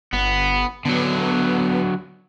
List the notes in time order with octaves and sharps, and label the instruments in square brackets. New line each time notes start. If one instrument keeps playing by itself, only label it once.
[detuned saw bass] G1 [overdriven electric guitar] B3
[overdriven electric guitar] D3 F#3 [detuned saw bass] B3